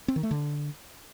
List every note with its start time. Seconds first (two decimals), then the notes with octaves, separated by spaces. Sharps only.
0.08 C4
0.16 D#3
0.23 A3
0.31 D3